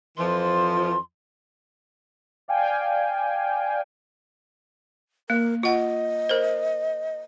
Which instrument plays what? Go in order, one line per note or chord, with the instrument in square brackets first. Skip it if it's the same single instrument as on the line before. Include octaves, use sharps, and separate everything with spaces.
[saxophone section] F2 E3 F3 [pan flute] C6
[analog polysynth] D5 F5 G5 G#5
[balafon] A#3 [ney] A#4
[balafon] F4 F#5 [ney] D#5
[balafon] A#4 C5